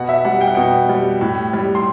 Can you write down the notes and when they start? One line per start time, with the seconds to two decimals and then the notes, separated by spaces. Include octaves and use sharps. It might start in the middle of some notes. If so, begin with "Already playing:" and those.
Already playing: B2 F#5
0.09 E5
0.25 G3 F#5
0.41 G5
0.48 F#5
0.55 B2 G5
0.89 G3
1.21 A2
1.53 G3
1.75 C6